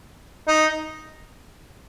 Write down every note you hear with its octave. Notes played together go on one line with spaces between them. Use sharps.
D#4